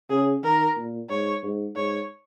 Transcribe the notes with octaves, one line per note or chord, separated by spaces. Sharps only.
C#3 G#4
D#3 A#4
A#2
G#2 C#5
G#2
G#2 C#5